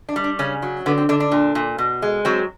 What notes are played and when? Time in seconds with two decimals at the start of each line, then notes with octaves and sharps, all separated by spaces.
0.09 D4
0.16 G3
0.24 D4
0.39 C#3 C#4
0.62 F#3
0.86 D3 B3
0.98 C4
1.09 D3 D4
1.20 D4
1.32 A#2
1.55 A#2
1.78 B2
2.02 G#3
2.25 F#3 C4